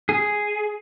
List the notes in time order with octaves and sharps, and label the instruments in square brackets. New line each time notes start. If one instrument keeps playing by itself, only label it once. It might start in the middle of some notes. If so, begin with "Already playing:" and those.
[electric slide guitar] G#4